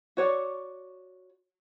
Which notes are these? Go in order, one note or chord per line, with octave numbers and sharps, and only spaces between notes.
F#4 C#5 D5